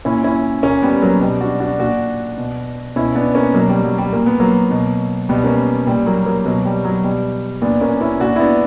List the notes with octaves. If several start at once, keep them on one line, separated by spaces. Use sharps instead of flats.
A#2 C#4 E4
C#4 E4
A#2 A#3 C#4
G3 B3
F#3 A#3
B2 G3
D4 F#4
D4 F#4
A#2 D4 F#4
B2
B2 C#4 E4
B3 D4
A#3 C#4
B2 F#3 A#3
G3
F#3
G3
A#2 A#3
B3
F#3 A#3
B2
B2 G3 B3
A#3 C#4
A#2 G3
F#3 A#3
F#3 A#3
B2 F#3 A#3
G3
F#3
B2 G3
A#2 B3 D4
A#3 C#4
C#4 E4
A#2 D4 F#4
E4
B3 D4